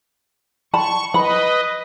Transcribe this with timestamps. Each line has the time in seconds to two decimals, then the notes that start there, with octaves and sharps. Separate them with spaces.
0.74 A5 B5 C#6
1.14 B4 D#5 B5